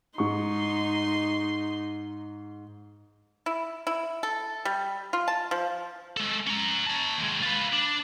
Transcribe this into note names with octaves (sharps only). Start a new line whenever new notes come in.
G#2 D#4 C6 C#6
E4
E4
A4
G3
F4
A5
F3
G#3 A4
C#4 A#5
C#5 A5
D#2 G#3
F4 B4
D4